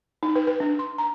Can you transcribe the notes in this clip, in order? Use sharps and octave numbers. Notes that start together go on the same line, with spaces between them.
D#4
B4
B4
D4
C6
A#5